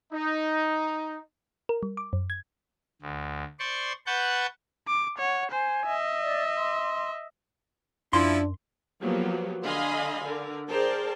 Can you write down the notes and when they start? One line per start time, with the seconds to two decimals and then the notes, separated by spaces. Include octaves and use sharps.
0.13 D#4
1.69 A#4
1.83 G3
1.97 D6
2.13 F#2
2.30 G#6
3.02 D2
3.59 C5 D5 C6 C#6
4.06 B4 F#5 A5 C#6 G6
4.88 D6
5.19 C#5 F#5
5.52 C5 G#5
5.86 D#5 E5
6.21 D5
6.58 C6
8.13 F#2 F3 D4 E4 C6
9.01 F3 F#3 A#3 B3 F#4 G4
9.63 D3 D#5 F5 G#5 B5 C6
10.23 D3 A#4
10.69 G#4 A#4 C5 D5 G5 A5